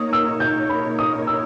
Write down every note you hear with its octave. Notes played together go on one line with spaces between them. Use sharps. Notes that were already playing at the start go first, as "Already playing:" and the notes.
Already playing: A#3 D#4 A#4 C#5 D#6
E6
G6
B5
D#6
E6